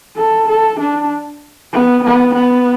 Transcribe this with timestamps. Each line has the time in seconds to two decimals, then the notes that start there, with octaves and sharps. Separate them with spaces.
0.17 A4
0.49 A4
0.80 D4
1.73 B3
2.04 B3
2.35 B3